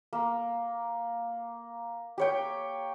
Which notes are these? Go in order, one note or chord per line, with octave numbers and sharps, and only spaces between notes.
A#3
G4 C#5 G5